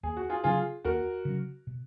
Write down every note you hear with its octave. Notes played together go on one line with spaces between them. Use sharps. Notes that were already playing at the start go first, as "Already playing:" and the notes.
D#2 G#4
F#4
F4 G#4
C#3 F#3 C#4 F4 G#4
D#2 F#4 A#4
C#3 F#3 C#4
B2